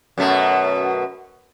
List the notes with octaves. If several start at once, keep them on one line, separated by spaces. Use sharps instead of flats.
F#2 B2 A3